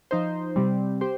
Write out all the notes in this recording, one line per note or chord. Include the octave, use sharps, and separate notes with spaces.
F3 D#4 C5
C3 G3 C4
G4 C5